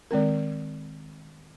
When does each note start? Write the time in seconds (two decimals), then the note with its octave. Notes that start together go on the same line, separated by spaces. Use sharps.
0.11 D#3 G#3 C4 A#4